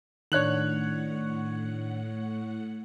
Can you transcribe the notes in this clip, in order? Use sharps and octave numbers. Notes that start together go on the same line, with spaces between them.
A2 D#3 D4 C#5 F#5 F#6 F#7